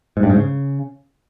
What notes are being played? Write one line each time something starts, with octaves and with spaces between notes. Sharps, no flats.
G#2
G2
G#2
C#3